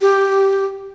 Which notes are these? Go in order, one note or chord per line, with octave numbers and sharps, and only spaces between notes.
G4